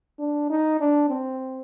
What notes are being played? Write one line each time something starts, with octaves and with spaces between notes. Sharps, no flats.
D4
D#4
D4
C4